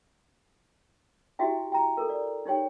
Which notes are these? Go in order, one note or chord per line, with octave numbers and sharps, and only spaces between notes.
E4 F#4 G4 E5 G5
G5 A#5
A4 A#4
D5
D#4 G4 C#5 G5